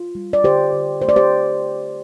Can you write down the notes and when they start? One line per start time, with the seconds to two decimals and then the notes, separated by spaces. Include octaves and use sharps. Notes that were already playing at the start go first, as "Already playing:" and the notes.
Already playing: F4
0.15 G3
0.33 D5
0.44 D3 G4 C5
0.73 D3
1.01 A3 C5
1.09 D5
1.16 G4 C5